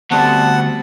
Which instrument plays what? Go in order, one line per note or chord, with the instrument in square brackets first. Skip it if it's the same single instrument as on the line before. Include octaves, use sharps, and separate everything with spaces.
[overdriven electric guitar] D2 [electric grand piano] G3 B3 C4 [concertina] F#5 [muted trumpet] A5